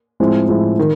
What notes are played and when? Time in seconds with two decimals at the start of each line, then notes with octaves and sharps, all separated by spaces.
0.20 A2 F3 G#3 C4 E4
0.49 A2 F3 G#3 C4 E4
0.79 D#3